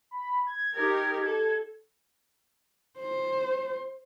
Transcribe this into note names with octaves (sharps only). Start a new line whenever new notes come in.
B5
G#6
D#4 G4 A#4
A4
C5